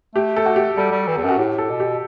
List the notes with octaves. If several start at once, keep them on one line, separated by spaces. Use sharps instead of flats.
A3 G4
A4
F#4
G4
G3 A4
G3
E3
E2
F#2 F#4
A2 G4
A4
B2
G4